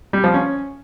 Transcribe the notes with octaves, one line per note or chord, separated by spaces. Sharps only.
G3
F3
C#4